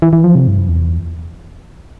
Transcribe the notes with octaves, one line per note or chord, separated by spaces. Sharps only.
E3
E3
F3
C3
G2
F#2
E2